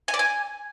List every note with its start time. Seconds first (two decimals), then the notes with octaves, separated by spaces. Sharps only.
0.08 G#5
0.14 D5
0.19 G#5